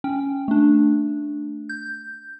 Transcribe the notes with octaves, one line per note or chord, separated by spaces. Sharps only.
C#4 G5
A3 D4
G6